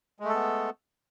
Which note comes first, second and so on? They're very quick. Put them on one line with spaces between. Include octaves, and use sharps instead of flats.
G#3 A3 A4 B3